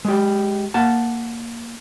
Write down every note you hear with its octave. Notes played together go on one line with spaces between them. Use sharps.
G#3 G4
A#3 F#5 A5